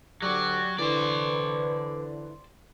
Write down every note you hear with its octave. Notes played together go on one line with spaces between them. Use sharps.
D2 F#3 G4 D5
D3 E3 B4 C5 D5